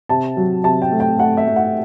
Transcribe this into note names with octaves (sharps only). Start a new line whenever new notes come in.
C3 A5
F#3
C3 A5
G5
A3
G5
A3 F#5
E5
A3
F#5